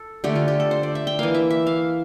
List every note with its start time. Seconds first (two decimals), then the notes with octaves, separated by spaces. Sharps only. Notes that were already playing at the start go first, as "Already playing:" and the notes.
Already playing: A4
0.24 D3 A3 G4
0.35 F4
0.48 G4
0.60 A4
0.71 C5
0.83 D5
0.95 E5
1.07 G5
1.19 E3 A#3 F5
1.34 E5
1.50 E5
1.67 F5